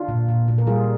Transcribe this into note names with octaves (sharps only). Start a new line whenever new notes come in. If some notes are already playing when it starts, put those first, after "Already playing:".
Already playing: D4 F4
A#2
A#2
A#2
A#4
G3 F4 G#4